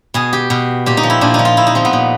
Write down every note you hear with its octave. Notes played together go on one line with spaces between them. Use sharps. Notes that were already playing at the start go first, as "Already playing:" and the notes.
B2 G#4
G4
B2
A#2 G4
D#4
F3
E4
A#2 D4
F3 D#4
F4
A#2 E4
D#4
F3 C4
B3
A#2